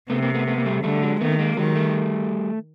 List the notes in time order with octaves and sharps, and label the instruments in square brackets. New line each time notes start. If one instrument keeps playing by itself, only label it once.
[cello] C3 [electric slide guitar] A3 B3
[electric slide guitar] A#3 C4
A3 B3
A3 B3
A#3
G3 A3
[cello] D3 [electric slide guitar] G3 A3
[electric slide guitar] F#3 G#3
[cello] D#3 [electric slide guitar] A3 B3
[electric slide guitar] B3
G#3 A#3
[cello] D#3 [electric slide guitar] F#3 G#3
[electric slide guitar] G3 A3